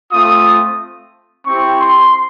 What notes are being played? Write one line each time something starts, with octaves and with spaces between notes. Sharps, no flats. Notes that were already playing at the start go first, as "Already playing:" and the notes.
A3 C4 F4 D#6
C4 E4 G4 C#6
C6